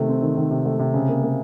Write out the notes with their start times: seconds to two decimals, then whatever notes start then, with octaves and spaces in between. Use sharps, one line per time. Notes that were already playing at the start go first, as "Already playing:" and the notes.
Already playing: C3 D#3 A3
0.09 C4
0.22 D#3
0.37 D#3
0.51 C3
0.66 A3
0.79 C3
0.94 C#3
1.09 A#3
1.23 A#3